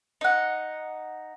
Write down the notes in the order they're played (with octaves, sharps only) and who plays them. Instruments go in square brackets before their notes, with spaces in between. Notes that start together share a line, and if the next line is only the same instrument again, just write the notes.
[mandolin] D#4 F#5